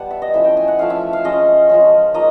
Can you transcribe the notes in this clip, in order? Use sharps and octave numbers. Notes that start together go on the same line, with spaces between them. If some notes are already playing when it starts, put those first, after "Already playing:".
Already playing: G3 B3 F#5 A5
E5
D#5
F3 A3 C#4 E4 E5
G5
G#5
F#5
F3 A3 C#4 E4 F5
E5
F5
F3 G#3 C#4 D#5
F3 G#3 C#4
F3 A#3 D#4 D#5